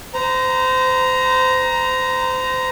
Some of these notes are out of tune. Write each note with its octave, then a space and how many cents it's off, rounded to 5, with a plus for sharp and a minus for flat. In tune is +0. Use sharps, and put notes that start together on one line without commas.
C5 -30 A#5 +5